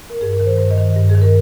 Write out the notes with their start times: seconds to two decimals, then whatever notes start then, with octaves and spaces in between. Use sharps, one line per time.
0.10 A#4
0.21 G2 G#4
0.33 A#4
0.40 D#3
0.46 C5
0.58 G2 C5
0.71 D#5
0.78 D#3
0.97 G2
1.09 G#4
1.15 D#3
1.22 A#4